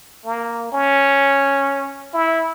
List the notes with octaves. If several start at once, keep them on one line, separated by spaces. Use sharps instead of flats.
A#3
C#4
E4